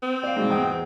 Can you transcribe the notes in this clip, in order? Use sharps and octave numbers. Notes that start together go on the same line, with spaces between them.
C4
D5 F5
G#2 B2
E2 G5 D#6